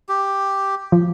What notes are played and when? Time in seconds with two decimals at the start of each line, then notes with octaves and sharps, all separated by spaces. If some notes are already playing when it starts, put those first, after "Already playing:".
0.09 G4
0.92 F3